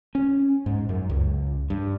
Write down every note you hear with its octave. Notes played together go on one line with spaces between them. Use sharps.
C#4
G#2
F#2
C#2
G2